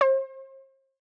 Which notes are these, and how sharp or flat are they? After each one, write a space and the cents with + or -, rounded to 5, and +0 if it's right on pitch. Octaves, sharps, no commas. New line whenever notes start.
C5 +40